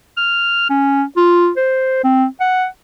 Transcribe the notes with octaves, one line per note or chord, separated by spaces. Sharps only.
F6
C#4
F4
C5
C4
F#5